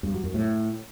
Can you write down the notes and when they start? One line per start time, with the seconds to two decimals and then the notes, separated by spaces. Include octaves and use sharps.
0.03 G2
0.13 F#3
0.24 F#2
0.34 A2